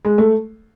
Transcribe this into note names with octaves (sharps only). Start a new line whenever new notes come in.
G#3
A3